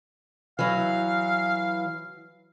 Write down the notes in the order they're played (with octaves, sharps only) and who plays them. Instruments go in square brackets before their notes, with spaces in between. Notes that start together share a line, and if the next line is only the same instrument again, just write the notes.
[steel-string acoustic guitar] E3 F#3 [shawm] F5